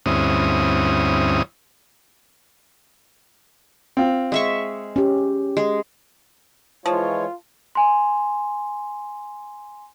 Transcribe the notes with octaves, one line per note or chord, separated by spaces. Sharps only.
D2 G2 C4 C#4 E4 D#6
C4 F4
G#3 E5 C#6
C#4 G4
G#3
E3 F3 G#3 F4 C#5
G#5 C6